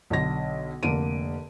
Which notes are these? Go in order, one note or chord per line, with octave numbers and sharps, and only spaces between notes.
B1 D3 A#6
F1 D3 A#3 A#4 D7 D#7